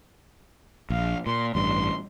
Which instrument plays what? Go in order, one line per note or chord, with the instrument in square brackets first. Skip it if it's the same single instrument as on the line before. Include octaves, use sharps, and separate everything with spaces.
[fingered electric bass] A#1 [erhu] F5
[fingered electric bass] A#2 [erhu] C6
[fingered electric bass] A1 G2 [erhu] C6